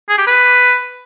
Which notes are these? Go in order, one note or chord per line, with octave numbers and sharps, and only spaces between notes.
G#4
G4
B4